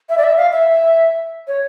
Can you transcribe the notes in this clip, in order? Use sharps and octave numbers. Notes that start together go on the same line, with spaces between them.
E5
D5
E5
F5
E5
C#5